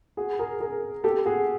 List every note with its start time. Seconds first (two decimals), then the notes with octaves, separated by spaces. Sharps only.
0.17 F#4 G#4
0.39 G#4 A#4
0.60 G#4 A#4
1.04 G4 A4
1.25 F#4 G#4